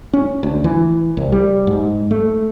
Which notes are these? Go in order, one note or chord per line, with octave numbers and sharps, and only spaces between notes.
C#4
D2
E3
C2
G3
G#2
A3